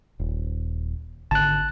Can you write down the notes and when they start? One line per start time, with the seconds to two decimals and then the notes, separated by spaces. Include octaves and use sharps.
0.20 D#1
1.31 G#1 D3 A5 F#6